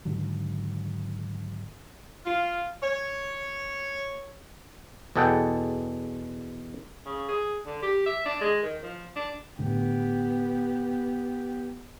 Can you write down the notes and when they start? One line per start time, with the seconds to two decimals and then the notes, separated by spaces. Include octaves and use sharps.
0.05 G#2 D3 D#3 F#3
2.26 F4
2.82 C#5
5.16 E2 B2 G#4 A4 F#5 G5
7.06 C#3
7.28 G#4
7.66 D3
7.82 G4
8.06 E5
8.25 D4
8.41 G#3
8.62 D#3
8.83 F3
9.16 D4
9.59 A2 D3 B3 G4